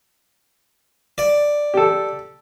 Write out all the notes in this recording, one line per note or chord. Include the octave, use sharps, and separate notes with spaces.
D5
G4 A4